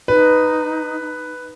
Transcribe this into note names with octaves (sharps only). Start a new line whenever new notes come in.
D#4 B4